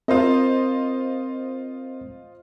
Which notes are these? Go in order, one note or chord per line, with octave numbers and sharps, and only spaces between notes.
C4 F4 A#4 C5 D#5